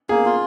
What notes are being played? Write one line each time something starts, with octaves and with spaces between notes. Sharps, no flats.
A#3 G#4
F4